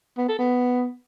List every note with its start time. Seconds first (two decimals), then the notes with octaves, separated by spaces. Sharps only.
0.18 B3
0.28 A4
0.39 B3